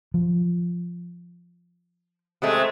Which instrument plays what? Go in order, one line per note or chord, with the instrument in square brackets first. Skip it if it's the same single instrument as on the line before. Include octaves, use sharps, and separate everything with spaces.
[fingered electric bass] F3
[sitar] C3 G#3 A3